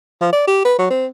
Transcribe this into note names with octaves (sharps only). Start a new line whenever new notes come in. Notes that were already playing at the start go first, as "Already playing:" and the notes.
F3
D5
G4
B4
F#3
C4